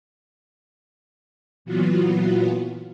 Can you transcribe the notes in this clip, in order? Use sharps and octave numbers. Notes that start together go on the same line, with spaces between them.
A#2 E3 F#3 B3 F4 F#4